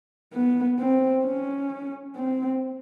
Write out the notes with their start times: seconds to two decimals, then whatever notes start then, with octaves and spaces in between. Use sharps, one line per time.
0.33 B3
0.79 C4
1.25 C#4
2.16 C4